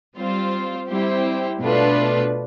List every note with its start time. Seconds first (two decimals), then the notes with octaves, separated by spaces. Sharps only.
0.17 G3 C4 F4 C5
0.89 G3 C4 E4 G4 C5
1.61 B2 A3 D4 F4 B4